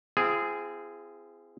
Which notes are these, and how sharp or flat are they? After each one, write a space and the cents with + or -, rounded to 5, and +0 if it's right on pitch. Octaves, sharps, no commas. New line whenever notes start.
C4 -20 F4 -45 G#4 +0